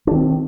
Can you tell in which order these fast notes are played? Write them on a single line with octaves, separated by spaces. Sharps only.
D4 D#3 C4